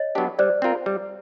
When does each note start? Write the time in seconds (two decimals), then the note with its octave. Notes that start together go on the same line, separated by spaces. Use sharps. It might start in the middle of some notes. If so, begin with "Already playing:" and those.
Already playing: C#5 D#5
0.15 F#3 B3 D4 G4
0.39 G3 C5 D5
0.62 C4 F4 A#4
0.86 G3